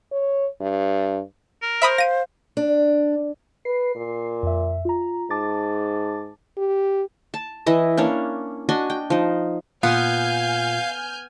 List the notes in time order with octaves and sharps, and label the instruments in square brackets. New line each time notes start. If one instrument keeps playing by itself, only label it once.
[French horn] C#5
G2
[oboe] A#4
[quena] C5 [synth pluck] E5 B5 D#6
[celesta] F5 [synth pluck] A#6 D#7
[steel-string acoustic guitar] D4
[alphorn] B4 [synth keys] C7
[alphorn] A#2
[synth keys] F2 E5
F4 A#5
[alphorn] G#2 [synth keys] A5 D6 A6
[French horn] G4
[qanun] A5
E3 E4 D#5
A#3 C#4 D4 C#5
D4 F#4 D#5 G#5
G5
F3 D#4
[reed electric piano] A#2 F4 [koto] B3 [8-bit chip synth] F5 [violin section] G#5 F6 G6